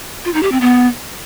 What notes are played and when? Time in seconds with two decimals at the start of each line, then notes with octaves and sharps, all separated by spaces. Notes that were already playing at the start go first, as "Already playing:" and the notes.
0.25 F4
0.34 D#4
0.43 G4
0.52 C4
0.61 B3